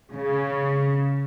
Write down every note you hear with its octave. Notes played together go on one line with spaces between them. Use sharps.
C#3